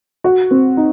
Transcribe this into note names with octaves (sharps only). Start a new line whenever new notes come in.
F#4
C4
D#4